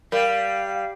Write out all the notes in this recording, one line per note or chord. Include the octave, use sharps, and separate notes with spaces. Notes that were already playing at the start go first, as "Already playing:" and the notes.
G3 A#4 F5